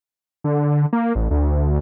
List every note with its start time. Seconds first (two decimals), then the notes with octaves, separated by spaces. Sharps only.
0.44 D3
0.93 A#3
1.15 A1
1.31 D2